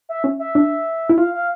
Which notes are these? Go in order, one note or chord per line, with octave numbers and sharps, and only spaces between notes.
E5
C#4
E5
D4
E4
F4 F5
F5